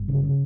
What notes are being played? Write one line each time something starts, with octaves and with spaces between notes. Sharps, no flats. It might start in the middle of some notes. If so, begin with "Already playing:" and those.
Already playing: G1
C#3
C#3